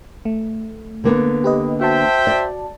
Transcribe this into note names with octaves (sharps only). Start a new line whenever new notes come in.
A3
D3 A#3 B3
G4 B4 D#5
F#4 C5 E5 G5 A5
D5